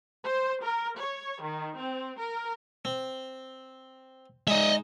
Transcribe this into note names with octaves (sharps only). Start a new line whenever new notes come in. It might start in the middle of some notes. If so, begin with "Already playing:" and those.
C5
A#4
C#5
D#3
C4
A#4
C4
G#3 D#4 D#5 E5